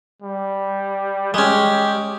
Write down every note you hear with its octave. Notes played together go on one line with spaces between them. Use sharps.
G3
G#3 C#4 G4